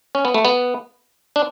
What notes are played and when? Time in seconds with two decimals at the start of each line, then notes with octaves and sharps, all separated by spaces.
0.15 C#4
0.25 B3
0.34 A3
0.45 B3
1.36 D4